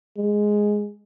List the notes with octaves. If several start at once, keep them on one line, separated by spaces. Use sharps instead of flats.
G#3